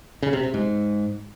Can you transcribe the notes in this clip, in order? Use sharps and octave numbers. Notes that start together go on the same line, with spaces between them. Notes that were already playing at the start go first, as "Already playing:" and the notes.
C#3
C3
C3
G#2